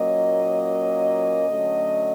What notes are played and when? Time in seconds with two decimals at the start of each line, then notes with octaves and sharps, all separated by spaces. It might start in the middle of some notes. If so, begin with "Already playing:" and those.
Already playing: A#2 F#3 A#3 C#4 D#5
1.47 D3 F#3 A3 C#4